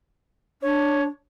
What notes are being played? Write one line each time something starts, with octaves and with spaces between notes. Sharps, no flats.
D4 C#5